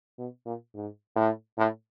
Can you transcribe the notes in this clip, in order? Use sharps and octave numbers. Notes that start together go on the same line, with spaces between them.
B2
A#2
G#2
A2
A2